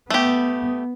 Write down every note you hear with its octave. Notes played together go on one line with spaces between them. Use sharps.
A3 B3 G4